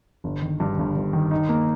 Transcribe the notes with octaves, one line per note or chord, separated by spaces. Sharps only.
G1
D#3
G2
G1
G1
D#3
D#4
A#3